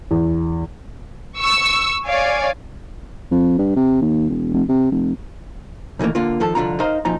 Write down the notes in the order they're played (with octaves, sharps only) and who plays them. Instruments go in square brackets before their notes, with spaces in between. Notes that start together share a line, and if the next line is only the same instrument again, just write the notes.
[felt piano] E2
[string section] C#6 E6
C#5 D5 F5 G#5
[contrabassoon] F2
G2
C3
D#2
E1
F1
C3
F1
[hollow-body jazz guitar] A#2 D#3 E3 A3 A#3
D3 A#3 F4
D#3 F3 A4
C2 F2 D3 D4 F4 A#5
D#4 A#4 C5 D#5 F5 A#5
F#2 A#2 F3 D#4 A#5